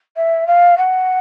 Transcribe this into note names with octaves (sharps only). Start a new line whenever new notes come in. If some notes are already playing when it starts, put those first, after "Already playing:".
E5
F5
F#5